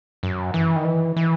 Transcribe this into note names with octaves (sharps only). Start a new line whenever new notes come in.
F#2
E3
D#3
E3
E3